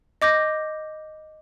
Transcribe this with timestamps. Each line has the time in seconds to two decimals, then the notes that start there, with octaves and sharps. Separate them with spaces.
0.22 D#5 D6 G6 A#6